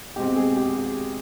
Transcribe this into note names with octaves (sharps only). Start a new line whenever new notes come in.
B2 G#3 C4 G4
G#4
G4
G4